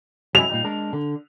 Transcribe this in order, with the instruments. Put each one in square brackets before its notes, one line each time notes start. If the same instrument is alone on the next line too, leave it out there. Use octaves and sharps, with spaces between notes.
[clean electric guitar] F#3 G#3 E4 [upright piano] F7
[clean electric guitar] A#2 G3 D#4
G#3 D4 A#4
D3